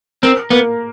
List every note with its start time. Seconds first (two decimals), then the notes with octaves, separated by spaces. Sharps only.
0.23 C4 A#4
0.50 A#3 B3